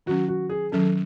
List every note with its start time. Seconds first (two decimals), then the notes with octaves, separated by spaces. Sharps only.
0.06 D#3 F#3 C#4 F#4
0.28 F#4
0.50 G#4
0.72 D#3 F#3 C#4 A4